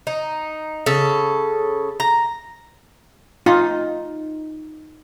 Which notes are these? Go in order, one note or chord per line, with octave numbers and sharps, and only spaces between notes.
D#4
C#3 A4
A#5
D#4 F4